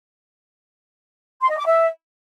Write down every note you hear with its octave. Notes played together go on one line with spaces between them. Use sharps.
C6
D#5
D6
E5